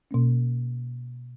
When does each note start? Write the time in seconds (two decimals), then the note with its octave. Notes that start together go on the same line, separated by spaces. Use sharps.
0.11 B2 A#3 C#4